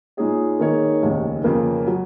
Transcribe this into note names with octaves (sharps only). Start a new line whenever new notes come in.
A#2 G#3 D#4 G#4 C#5
D#3 A#3 D#4 G#4 C#5
F1 D#2 C#3
F2 C#3 F3 A#3
F#3